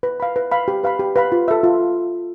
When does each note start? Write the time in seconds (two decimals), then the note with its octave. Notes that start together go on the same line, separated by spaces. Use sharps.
0.03 B4
0.20 F5 B5
0.36 B4
0.51 F5 B5
0.68 G4
0.84 B4 F5 B5
0.99 G4
1.16 B4 F5 B5
1.32 F4
1.48 A4 E5
1.64 F4